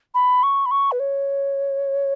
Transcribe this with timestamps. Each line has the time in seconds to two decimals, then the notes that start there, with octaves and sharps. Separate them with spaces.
0.14 B5
0.43 C#6
0.66 B5
0.71 C#6
0.92 B4
1.00 C#5